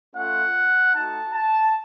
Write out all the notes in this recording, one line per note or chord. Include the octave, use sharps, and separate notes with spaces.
A3 C#4 F4 F#5
A3 D#4 F#4 A5
A5